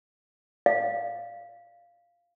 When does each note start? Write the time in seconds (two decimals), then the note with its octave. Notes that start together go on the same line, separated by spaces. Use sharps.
0.66 D5 F5